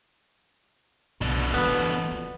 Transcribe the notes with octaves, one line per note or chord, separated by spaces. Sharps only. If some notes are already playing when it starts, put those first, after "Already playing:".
B1 B2 D3
E3 F#3 B3
F4